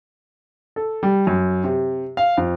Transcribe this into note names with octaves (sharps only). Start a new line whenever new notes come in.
A4
G3
F#2
C3
F5
F2